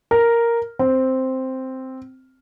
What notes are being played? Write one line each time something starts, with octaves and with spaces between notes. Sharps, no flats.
A#4
C4